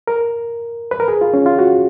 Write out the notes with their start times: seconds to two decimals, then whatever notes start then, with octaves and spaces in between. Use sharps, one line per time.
0.07 A#4
0.91 B4
1.00 A#4
1.08 G#4
1.21 F4
1.34 C#4
1.46 F4
1.59 F#4